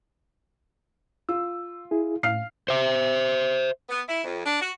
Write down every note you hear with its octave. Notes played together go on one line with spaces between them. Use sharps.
F4 E6
E4 G#4
A2 F5 F6 C7
C5 E5
B3
E4
F2
D4
F#4